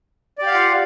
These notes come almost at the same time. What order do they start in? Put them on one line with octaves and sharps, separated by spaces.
D5 G4 F5 F#5 F4